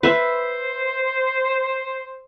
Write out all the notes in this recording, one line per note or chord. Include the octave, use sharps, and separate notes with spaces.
B4 C5 E5